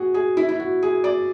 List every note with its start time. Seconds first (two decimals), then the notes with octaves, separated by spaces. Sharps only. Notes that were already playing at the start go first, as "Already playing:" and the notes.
Already playing: F#4 G#4
0.14 G#4
0.37 E4
0.48 E4
0.60 F#4
0.83 G#4
1.04 D5